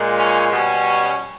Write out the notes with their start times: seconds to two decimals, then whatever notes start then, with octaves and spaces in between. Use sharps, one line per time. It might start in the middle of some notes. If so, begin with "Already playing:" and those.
Already playing: A#2 G#3
0.17 C#4
0.51 B2 G3 C#4